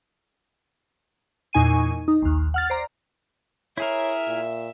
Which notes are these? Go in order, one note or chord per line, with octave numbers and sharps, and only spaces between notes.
E2 A#2 D#4 G#5 C#6 D#7
D#4
A#1 D#2
F#5 F6 A6
C5 D5 A#5
E4 G#4 A#4 C#5 E5
A#2